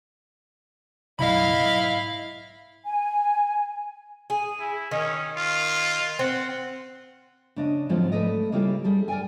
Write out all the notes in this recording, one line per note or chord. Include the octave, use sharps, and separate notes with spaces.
F#1 B1 F#3 E4 D#5 F5 B5
G#2
G#5
G#4
E4
D#3 C#4
F4
C4 F#5
C#3 D4 D#5
G#2 D3 F3 F#3 C4 F4
A3 A4 B4 D5 D#5
C#3 G3 A#3 E4 F4 G4
G3 G#4 A4
A#4 D5 E5 G5 G#5